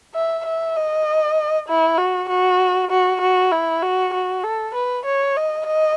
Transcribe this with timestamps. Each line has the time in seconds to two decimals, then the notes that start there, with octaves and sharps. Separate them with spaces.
0.15 E5
0.45 E5
0.76 D#5
1.68 E4
1.98 F#4
2.29 F#4
2.91 F#4
3.21 F#4
3.52 E4
3.83 F#4
4.14 F#4
4.44 A4
4.74 B4
5.05 C#5
5.36 D#5
5.67 D#5